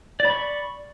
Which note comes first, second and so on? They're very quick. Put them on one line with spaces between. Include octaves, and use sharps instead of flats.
D5 B5 C#6